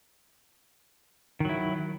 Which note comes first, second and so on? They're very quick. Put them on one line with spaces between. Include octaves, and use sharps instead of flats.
D#3 F#3 E4